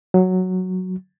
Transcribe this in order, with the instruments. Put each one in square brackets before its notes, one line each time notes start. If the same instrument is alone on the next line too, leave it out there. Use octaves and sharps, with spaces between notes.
[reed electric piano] F#3